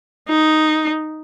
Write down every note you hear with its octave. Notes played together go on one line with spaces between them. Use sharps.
D#4